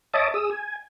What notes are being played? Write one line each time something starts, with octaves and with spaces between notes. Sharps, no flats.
C#5 D#5 E5 A5 D6 D#6
G#4 D#6 E6
G#5